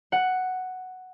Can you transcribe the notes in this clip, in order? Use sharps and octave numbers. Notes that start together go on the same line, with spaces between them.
F#5